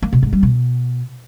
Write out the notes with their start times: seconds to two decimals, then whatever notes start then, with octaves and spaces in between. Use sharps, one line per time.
0.03 A#3
0.13 B2
0.23 G#2
0.33 G3
0.43 B2